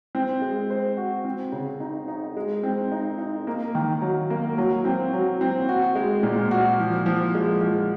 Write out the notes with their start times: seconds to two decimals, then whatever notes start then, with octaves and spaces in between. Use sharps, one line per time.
0.15 C4
0.42 G#3
0.70 C5
0.97 F#4
1.25 C4
1.52 C#3
1.80 D#4
2.08 D#4
2.37 G#3
2.63 C4
2.92 D#4
3.18 D#4
3.47 A#3
3.75 D#3
4.02 F#3
4.30 A#3
4.58 F#3
4.85 C4
5.13 F#3
5.41 C4
5.69 F#4
5.95 G#3
6.23 A#2
6.51 F#4
6.79 F3
7.06 F3
7.35 G#3
7.61 F3